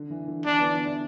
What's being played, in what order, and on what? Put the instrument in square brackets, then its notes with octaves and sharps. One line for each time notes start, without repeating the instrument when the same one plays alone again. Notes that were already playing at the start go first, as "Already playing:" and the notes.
Already playing: [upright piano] D3
E3
D3
[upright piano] E3 [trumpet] D4
[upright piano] B3
D4
E4